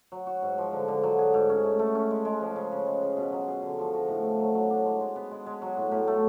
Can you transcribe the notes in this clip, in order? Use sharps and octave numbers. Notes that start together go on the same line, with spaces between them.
F#3
F#4
G#2
F3
D3
D3
F#3
G#4
G#2
C#4
A3
A3
C#4
G#3
G#3
F3
C#3
C#3
G#3
G#4
B2
F#3
G#4
D3
F3
F#4
A2
A3
F#3
F#3
D4
G#3
G#3
B3
G#3
G#3
F#3
A2
A2
A3